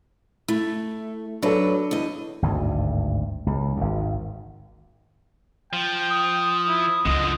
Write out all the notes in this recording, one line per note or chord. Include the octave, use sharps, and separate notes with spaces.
A3 E4
F#3 D4 A4 B4
E2 D#5
G#1 D2 G2
C#2
G#1 D#2
F3 G5
D#6
E4
C#2 D3 F3 D#5